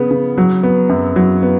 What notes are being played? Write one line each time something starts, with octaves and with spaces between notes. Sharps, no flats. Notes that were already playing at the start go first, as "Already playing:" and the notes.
Already playing: C#3 B3
C#3
F#3
B3
F#2
F#3
B3